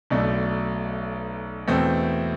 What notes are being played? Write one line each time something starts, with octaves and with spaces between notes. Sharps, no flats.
B1 B2 A3 D4
E2 B2 A3 C4